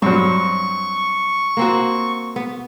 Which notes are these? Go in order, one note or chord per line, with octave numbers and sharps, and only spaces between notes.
G2 F#3 C4 C#6
A#3 C4 F#4
B3